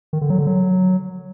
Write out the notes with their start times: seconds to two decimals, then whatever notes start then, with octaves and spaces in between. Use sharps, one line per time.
0.13 D#3
0.21 D3
0.30 F#3
0.38 D3
0.47 F#3